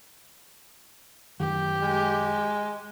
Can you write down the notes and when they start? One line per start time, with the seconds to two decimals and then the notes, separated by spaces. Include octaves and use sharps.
1.40 F#2 D#3 G4
1.82 G#3